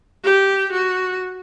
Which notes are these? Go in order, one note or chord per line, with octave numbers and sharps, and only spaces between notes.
G4
F#4